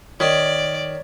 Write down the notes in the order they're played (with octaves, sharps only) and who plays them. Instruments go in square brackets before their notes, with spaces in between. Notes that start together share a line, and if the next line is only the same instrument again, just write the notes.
[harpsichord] D#3 [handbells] C#5 B6 [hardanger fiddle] D5